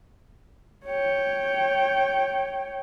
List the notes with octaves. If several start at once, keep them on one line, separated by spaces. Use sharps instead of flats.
C#5 G5